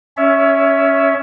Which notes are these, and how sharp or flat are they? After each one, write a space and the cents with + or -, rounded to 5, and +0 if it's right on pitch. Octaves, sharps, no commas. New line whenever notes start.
C#4 +0 C#5 +30 E5 +0